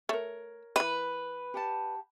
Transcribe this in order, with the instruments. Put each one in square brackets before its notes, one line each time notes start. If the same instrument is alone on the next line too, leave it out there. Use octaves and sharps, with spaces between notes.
[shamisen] A3 [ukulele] A#4 C#5
[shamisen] D#3 E3 [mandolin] B4
[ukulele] G4 F#5 A5